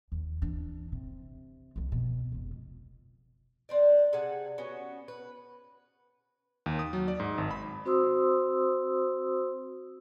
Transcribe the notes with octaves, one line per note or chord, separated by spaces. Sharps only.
D#2
E3 D4
C3
C2 F2
B2
F1 C#2
C4 D4 D5
C3 G#4 A4 F#5
B3 C#4 F#4
B4
D#2
D#6
F#3
D5
G#2
G#1
B5
C4 F#4 C5 C6 D#6 E6